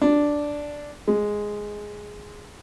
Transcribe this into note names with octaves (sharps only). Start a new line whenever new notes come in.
D4
G#3